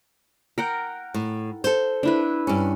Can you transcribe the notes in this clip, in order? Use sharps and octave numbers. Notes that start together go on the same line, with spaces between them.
A#4 F#5 G5
A2
A4 C5
D4 E4 B4
G2 C#4